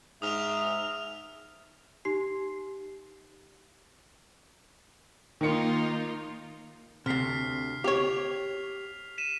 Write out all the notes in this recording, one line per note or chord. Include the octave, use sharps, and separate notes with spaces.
G#2 E5 D#6 F6 F7
D#4 G4 C7
D#3 A#3 D#4 F4 C#7
D2 C3 F6 B6 C7
G4 C#5 F7
B6 D#7 E7